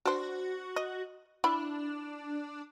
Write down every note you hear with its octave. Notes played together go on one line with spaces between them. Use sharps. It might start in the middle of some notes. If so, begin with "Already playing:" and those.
D4 F#4 C5
D#5
D4 E4 B5